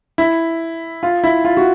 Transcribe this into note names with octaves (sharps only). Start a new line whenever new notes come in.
E4
F4
E4
F4
F#4